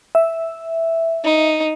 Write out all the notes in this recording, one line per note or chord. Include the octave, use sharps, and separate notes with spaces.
E5
D#4